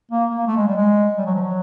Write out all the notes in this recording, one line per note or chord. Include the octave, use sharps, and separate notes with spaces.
A#3
A#3
A3
G#3
G3
G#3
G3
F#3
F3
F#3